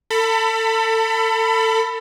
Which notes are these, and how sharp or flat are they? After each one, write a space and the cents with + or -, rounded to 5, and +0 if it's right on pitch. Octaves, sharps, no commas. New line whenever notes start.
A4 +25 B5 +5